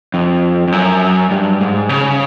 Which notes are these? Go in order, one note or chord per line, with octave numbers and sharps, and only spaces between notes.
F2
F2
F#2
G2
G#2
C#3